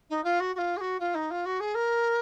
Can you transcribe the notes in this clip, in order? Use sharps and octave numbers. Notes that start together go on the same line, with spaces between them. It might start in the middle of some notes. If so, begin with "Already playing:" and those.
D#4
F4
F#4
F#4
F4
G#4
F#4
F4
D#4
F4
F#4
G#4
A#4